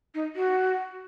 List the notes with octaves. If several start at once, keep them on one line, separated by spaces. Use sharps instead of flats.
D#4
F#4